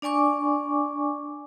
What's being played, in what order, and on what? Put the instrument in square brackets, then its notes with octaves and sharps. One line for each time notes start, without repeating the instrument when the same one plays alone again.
[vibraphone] D4 D5 G#5 C#6 D6